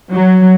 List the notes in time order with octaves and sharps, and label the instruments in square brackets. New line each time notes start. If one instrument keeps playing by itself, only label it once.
[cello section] F#3